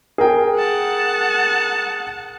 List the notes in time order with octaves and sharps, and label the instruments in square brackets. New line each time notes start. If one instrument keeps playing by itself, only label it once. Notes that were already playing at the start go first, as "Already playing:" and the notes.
[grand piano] G#4 A#4 G5
[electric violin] F#5 A5